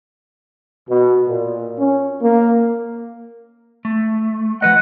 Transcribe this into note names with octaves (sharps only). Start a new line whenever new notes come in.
B2
A#2
C#4
A#3
A3
F3 B4 D#5 F#5